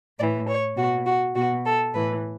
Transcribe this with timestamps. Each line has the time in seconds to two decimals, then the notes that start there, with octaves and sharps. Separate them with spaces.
0.19 A2 E3 D5
0.48 C#5
0.77 B2 F#4
1.06 F#4
1.35 B2 F#4
1.65 A4
1.94 A2 E3 B4